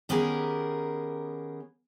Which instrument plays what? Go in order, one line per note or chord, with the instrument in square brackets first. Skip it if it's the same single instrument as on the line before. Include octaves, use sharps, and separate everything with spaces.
[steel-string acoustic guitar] D#3 B3 C#4 G4 G#4 A#4